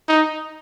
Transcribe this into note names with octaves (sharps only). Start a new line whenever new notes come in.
D#4